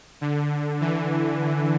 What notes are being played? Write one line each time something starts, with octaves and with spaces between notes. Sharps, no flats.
D3
E3